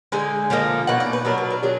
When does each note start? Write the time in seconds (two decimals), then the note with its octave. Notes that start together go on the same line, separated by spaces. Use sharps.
0.12 D3 G#3 D#4 G#5
0.50 D3 F3 A#3 D#4
0.87 B2 A#3 D#4 F#5
1.00 D5
1.13 B4
1.25 B2 F#3 D4 A#4
1.38 B4
1.50 A#4
1.63 D#3 F#3 D4 G#4